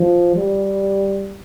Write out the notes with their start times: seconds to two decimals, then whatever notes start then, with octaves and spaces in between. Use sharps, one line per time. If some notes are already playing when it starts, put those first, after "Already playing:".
Already playing: F3
0.36 G3